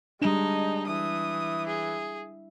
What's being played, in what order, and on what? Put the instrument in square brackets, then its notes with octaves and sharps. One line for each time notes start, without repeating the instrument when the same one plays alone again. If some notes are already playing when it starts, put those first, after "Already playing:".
[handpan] G3 D4 [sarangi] G#3 [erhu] D#4
[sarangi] E3 [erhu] D#6
[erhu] G#4